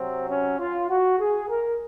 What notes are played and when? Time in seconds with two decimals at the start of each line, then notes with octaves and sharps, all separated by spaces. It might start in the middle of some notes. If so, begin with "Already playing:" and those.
Already playing: C3 F#3 C4
0.28 C#4
0.58 F4
0.88 F#4
1.18 G#4
1.49 A#4